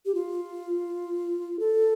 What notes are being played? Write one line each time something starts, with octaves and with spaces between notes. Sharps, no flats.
G4
F4
A4